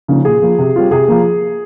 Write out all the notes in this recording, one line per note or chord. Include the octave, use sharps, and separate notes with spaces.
C#3 F3 A#3 D#4
A#2 G#4
F3 A#3
C3
G3 C4 F4
C3 G#4
F3 A#3